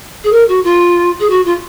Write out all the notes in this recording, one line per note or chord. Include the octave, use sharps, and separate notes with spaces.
G#4
A#4
F#4
F4
G#4
F#4
F4